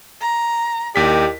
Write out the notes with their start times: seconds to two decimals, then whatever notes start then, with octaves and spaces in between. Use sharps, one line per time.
0.21 A#5
0.96 D#2 E4 G4 A#4 D5 D#5 B6